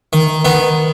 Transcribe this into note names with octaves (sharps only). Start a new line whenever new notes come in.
D#3
D#3 B3